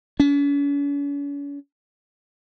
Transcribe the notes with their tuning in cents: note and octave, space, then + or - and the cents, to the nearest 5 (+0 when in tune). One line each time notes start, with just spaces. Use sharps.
C#4 +45